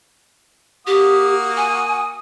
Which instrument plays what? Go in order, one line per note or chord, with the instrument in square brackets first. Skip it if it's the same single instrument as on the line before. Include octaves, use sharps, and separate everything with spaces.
[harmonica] A#3 F#4 D#6 [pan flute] G4
[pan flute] G#5